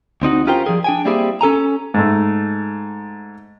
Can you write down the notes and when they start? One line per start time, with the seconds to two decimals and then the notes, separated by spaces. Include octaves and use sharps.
0.22 D2 C4 D#4 F#4
0.47 C#4 F4 G4 A#4 C5 G5
0.66 F3 G3 G#4
0.84 D4 G5 G#5
1.05 G3 A#3 C4 E4 G4 G#4
1.41 C#4 A4 G#5 A#5
1.94 G#2 A3